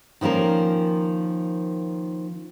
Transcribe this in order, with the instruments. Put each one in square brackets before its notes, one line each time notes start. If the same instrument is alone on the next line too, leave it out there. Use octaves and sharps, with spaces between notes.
[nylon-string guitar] D#3 F3 A#3 C#4 A#4